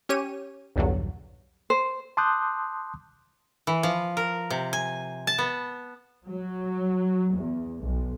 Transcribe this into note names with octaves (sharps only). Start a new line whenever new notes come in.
C#4 G4 C#5 D#7
B1 E2 G2 D3 F#3
C5
A5 C6 D6 D#6 F#6 G6
E3
F3
A#4
C3
G#5
A5
B3
F#3
E2
B1